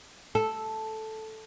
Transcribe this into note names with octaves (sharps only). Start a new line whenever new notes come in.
A4